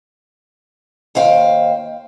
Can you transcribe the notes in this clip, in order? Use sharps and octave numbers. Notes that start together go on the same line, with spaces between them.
D#2 C5 F5 G5